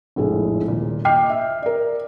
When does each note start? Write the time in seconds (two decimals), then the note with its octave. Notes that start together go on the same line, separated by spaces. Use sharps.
0.16 F1 A#1 A2 F3 G#3
0.68 D#1 A#2
1.05 D#5 G5 D6 F6 C7
1.30 E5
1.62 A#4 D5